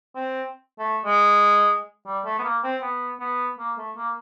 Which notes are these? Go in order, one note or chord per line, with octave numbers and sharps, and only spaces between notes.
C4
A3
G#3
G3
A3
B3
A#3
C4
B3
B3
A#3
A3
A#3